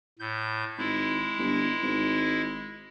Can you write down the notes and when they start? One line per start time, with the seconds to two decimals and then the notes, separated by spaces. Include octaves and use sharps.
0.19 A2 G6
0.78 G#1 G#3 E4
1.39 G1
1.83 G#1